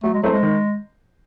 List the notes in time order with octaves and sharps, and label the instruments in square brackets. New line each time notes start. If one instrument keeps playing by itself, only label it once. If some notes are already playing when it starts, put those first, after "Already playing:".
[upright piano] F#3 [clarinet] A3
[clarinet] G#3
[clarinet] F#3 [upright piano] A3 C4 E4 C5
[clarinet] G#3
[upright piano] D#3